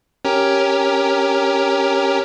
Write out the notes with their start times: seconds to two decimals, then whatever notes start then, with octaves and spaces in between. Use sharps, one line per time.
0.25 C#4 G4 A#4